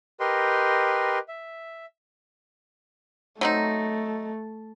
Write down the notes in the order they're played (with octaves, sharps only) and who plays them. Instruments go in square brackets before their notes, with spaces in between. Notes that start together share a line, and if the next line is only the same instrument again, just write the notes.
[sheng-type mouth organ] G4 A#4 B4 D#5 G5 C6
E5
[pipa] F#3 C4 D#4 [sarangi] A3